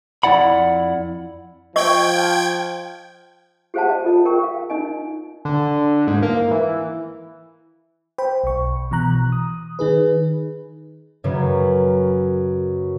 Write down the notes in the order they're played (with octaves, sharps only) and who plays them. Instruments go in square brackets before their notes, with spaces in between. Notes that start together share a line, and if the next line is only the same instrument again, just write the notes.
[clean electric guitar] F2 E4 D5 F#5 B5
[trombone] F3 [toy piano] D#5 C#6 [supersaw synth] G5 G#6
[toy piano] G4 G#4 C5 F5 F#5 A5
D#5 A5
F4 A4 D#5
G#4 A#4 G5 C#6
F5
D4 D#4 D#5 G#5
[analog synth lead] D3
G#2
A#3
E3
[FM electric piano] C5 G5 B5
B1 C#6
B2 E3 A#5 F#6
D#6
D#3 D#4 G#4 B4
[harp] F#2 C#3 C#4 A#4 B4